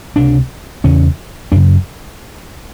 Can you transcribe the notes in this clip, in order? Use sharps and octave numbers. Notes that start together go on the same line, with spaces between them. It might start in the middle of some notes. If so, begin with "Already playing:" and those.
C#2 C3 D4
E2 C#3 C#4
F#2 C#3 D4